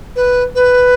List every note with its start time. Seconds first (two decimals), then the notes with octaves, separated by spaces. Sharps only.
0.15 B4
0.54 B4